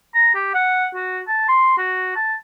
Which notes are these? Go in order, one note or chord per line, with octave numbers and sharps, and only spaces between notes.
A#5
G4
F#5
F#4
A5
C6
F#4
A5